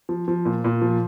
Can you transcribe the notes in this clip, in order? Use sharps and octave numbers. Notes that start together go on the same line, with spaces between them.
F3
F3
A#2
A#2
F3